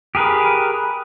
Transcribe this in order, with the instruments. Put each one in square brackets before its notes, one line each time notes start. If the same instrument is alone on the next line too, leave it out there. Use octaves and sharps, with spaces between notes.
[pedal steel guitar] G4 G#4 A#4 B4